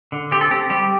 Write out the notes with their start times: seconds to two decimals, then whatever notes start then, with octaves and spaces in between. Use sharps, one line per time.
0.12 D3
0.31 C4 G4
0.41 A4
0.51 C4 G4
0.70 G3 G4